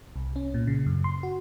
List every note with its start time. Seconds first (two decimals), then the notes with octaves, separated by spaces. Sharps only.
0.16 C2
0.36 C#4
0.54 A#2
0.67 C#3
0.86 F#2
1.04 C6
1.23 F#4